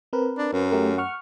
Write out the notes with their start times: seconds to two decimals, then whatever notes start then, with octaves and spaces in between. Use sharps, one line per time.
0.13 C4 A#4 B4
0.38 D4
0.52 F#2
0.72 A3 G4 A#4
0.98 F#5 C#6 F6